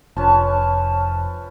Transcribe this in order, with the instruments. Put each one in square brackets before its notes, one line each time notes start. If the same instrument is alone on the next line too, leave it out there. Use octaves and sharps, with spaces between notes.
[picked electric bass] F1 [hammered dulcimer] F3 C#4 B4 [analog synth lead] A5